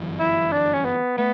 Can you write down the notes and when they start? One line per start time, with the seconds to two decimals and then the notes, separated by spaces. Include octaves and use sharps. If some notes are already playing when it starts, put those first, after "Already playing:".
Already playing: G1 F#2 E3
0.20 E4
0.52 D4
0.73 C#4
0.85 B3
1.17 A3 B3